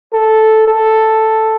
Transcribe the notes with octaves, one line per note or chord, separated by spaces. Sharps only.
A4
A4